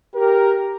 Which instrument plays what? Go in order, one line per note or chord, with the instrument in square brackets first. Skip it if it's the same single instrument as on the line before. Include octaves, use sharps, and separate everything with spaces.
[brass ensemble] G4 A#4